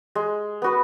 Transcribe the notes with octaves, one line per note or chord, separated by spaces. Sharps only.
G#3
B3 F#4 B4